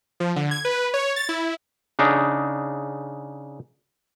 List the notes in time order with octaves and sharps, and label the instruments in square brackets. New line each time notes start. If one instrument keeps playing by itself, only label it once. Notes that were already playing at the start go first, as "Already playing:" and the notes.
[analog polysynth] F3
D3
G#6
B4
C#5
A6
E4
[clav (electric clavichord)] C#3 D4 D#4